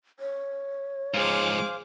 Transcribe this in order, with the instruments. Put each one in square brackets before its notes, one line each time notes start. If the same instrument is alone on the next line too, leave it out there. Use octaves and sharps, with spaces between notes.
[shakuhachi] C#5
[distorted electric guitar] G#2 F3 [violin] G#4 D6 [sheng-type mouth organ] C5 F5